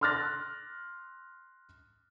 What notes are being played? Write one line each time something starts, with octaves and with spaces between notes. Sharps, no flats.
C6 D6 F6 F#6 A6 A#6